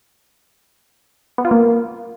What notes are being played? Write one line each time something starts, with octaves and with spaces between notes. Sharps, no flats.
B3
F4
A#3